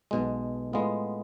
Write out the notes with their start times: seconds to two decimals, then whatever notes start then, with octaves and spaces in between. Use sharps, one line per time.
0.11 B1 B2 G#3
0.73 A2 G#3 B3 F4